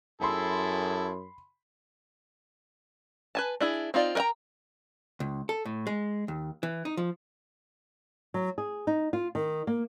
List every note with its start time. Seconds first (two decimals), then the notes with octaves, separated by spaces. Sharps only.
0.22 F#2 E4 G#4 A4 B5 C6
3.35 B4 G#5 A5
3.61 D4 E4 G#4
3.94 C4 D#4 F4 D5
4.15 A#4 B4 D#5 G5 A#5
5.20 C#2
5.49 A4
5.65 A2
5.87 G#3
6.28 D#2
6.63 E3
6.85 D#4
6.97 F3
8.34 F#3
8.58 G#4
8.87 D#4
9.13 F4
9.35 D#3
9.67 A#3